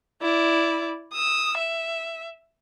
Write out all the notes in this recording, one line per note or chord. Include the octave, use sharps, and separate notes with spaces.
E4 D5
D#6 E6
E5